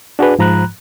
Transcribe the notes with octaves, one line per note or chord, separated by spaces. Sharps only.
D4 F#4 G#4 B4
G#2 F3 A#5 B5 F#6